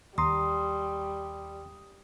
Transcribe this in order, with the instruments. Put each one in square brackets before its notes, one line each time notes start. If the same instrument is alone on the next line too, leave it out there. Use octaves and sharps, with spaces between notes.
[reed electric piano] D#2 A#5 C6 [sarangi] G3 [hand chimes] D#6